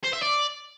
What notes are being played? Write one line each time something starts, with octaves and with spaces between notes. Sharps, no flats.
C5
E5
D5